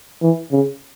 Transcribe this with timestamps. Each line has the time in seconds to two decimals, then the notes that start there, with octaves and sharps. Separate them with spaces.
0.22 E3
0.52 C#3